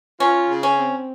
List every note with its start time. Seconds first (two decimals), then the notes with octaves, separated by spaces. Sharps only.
0.20 C#4 F4
0.49 C#3
0.63 C#4
0.79 C4